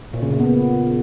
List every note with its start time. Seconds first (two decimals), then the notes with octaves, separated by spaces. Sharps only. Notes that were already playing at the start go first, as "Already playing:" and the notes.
0.13 A#2
0.22 C#3
0.31 A#2
0.40 B3